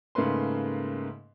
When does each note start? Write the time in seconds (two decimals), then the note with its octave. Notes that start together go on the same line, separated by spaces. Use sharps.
0.15 G#2 C#3 A3 A#3 B4 C6